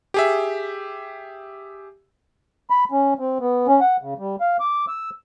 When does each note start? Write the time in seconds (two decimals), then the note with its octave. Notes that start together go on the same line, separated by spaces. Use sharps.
0.14 G4 G#4 E5
2.70 B5
2.92 C#4
3.19 C4
3.40 B3
3.67 C#4
3.81 F#5
4.02 C#3
4.18 G3
4.41 F5
4.60 D6
4.88 E6